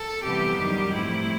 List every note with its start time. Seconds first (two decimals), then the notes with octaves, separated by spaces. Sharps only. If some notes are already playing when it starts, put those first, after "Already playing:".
Already playing: A4
0.24 C3 E3 G3 B3 G4
0.58 F#2 D#3 G3
0.92 A2 F3 A3 C4 E4